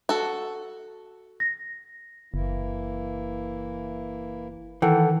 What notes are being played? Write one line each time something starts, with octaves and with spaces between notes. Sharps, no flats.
F#4 A4
A#6
F#1 E3 A#3 E4
D#3 E3 A4 F#5 G5